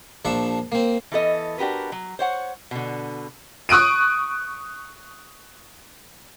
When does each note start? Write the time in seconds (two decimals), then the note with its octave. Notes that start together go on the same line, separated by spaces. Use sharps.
0.25 A#1 F3 D4 E5 C#6
0.72 A#3 C4
1.12 E3 B3 A4 D#5
1.58 D4 F#4 G4 A#4 B4
1.92 F#3
2.19 C5 C#5 F#5
2.71 B2 D3
3.69 C#6 D#6 F#6 D7 D#7